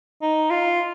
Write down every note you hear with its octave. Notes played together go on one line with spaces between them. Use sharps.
D#4
F4